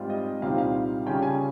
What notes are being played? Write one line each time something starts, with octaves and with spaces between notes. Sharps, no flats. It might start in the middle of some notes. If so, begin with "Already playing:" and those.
Already playing: G#2 G3 C4 F4
D#5
C2 A#2 G3 C4 D#4 F5
F5
C#3 G3 C#4 F4 G5
G#5